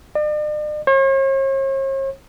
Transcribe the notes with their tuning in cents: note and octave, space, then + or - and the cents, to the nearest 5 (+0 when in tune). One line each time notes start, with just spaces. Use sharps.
D5 +45
C#5 -45